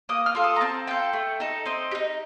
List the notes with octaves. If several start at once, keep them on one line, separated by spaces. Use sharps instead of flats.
A#3 D#6
F6
F4 A4
D#6
A#5
C4 A5
F4 A4 G5
A3
D#4 A4
C4 D#5
G4
D#4